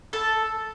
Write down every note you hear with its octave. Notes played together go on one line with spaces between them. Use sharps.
A4 A5